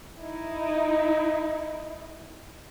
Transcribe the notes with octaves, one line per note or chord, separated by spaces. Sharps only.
D#4 E4